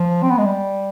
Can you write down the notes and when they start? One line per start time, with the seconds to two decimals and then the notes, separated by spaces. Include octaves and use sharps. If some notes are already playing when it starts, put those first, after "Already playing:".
Already playing: F3
0.23 C4
0.30 B3
0.38 G#3
0.45 G3